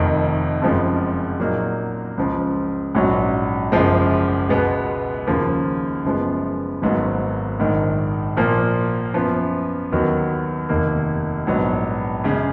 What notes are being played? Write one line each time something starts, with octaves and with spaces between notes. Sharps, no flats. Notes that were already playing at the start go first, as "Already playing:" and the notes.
Already playing: F1 F2 D#3
F#1 F2 C#3 F3 G#3
A#2 F#3 A#3 D#4
C#2 C#3 F3
A#1 G#2 F#3 C#4 F#4
F#1 F#2 F3 G#3
C#2 B2 G#3 B3
D#2 C#3 F3 A#3
F#1 F#2 F3 G#3 B3
G#1 G#2 F#3 B3
A#1 G#2 D#3
A#2 F3 A#3
F#2 F3 B3
D#2 D#3 F#3 B3 F#4
F1 D#2 D#3 A#3
A#1 G#2 F#3 B3
F#2 C#3 G#3